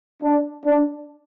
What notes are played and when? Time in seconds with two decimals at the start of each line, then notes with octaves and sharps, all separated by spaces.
0.23 D4
0.66 D4